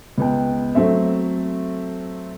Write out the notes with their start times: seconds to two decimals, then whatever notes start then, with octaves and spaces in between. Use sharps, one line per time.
0.18 C#2 B3 G5
0.75 F#3 A3 C4 E5